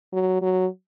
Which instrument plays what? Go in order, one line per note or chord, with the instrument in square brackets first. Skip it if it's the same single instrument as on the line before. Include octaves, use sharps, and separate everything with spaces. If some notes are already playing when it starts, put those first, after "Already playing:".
[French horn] F#3
F#3